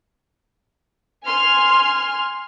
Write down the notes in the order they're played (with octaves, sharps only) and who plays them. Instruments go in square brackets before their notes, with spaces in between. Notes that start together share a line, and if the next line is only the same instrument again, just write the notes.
[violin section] G#5 C6 F6